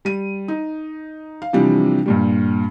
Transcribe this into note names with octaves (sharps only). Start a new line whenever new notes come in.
G3 D#7
D#4
F5
C3 E3 F3 G3 D4
G2 A#2 G3